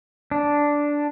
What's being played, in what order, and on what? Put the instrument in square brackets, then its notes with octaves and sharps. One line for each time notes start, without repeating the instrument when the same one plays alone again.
[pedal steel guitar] D4